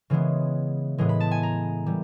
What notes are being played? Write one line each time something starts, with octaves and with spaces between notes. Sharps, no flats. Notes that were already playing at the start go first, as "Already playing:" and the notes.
C#3 E3 G#3 B3
A2 E3 G#3 B3
B5
A5
G#5
A#5
E3 G3